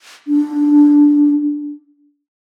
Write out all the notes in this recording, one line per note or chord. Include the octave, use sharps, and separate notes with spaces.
D4